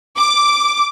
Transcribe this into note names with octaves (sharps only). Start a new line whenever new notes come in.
D6